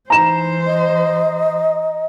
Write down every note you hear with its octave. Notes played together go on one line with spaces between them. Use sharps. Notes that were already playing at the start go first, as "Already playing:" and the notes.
E3 D#4 C5 A#5 E7
D#5